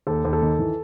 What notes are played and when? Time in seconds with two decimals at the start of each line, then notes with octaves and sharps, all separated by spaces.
0.07 D#2 A4
0.25 D#2
0.33 A4
0.42 D#3
0.59 E3